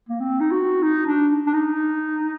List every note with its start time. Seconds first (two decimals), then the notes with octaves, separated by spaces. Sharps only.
0.09 A#3
0.20 C4
0.40 D#4
0.51 F#4
0.83 D#4
1.06 D4
1.47 D4
1.53 D#4